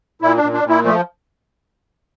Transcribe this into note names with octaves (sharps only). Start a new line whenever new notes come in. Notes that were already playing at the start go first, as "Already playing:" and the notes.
A#2 E4
D4
A#2
D4
A#2
E4
F3 A3